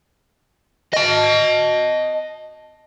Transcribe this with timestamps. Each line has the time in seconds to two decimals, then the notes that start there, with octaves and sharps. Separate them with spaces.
0.93 D#5 A5